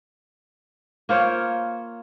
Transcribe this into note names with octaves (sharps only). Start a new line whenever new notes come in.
A#3 F4 C5 C#5